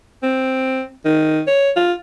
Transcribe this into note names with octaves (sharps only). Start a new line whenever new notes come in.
C4
D#3
C#5
F4